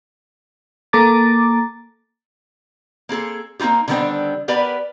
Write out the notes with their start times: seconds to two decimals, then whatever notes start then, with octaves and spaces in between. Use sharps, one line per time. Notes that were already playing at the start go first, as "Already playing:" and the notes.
0.93 A#3 A4 A#5 D6 A6
3.09 A#3 C4 G#4 A4
3.59 A#3 C4 D#4 F4 G4
3.88 D3 D#3 G3 B3 C4 D4
4.48 B3 G4 A#4 B4 D5 G#5